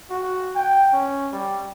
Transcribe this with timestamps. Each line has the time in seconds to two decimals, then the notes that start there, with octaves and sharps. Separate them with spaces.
0.10 F#4
0.55 G5
0.93 C#4
1.32 G3